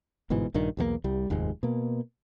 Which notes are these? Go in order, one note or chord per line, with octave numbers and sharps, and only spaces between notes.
G1 G#2 B2 E3
A#1 G2 D#3
B1 E2 E3 A#3
C2 G3
F1 D#2 G#2 G#3
B2 A#3